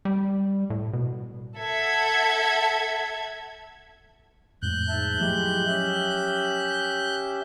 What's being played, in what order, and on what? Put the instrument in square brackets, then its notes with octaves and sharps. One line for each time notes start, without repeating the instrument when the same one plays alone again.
[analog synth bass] G3
A2
B2
[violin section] A4 E5 F#5 G#6
[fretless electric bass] F2 A2 G#3 [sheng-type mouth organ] F#6 G6
[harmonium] G#2 E5 A5
[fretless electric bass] F3 F#3 A3 [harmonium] G#3 E4 G4
[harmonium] C#4 G4 E5